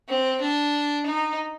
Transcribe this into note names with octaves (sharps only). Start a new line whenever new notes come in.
C4
D4
D#4